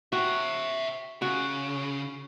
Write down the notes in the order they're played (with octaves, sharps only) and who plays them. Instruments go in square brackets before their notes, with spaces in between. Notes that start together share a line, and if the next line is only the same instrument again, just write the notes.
[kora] F#4 [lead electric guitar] E5 G5
[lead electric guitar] C#3 [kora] F#4